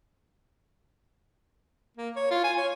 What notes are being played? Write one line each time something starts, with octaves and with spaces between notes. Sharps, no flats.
A#3
C#5
F4
G#5
C#5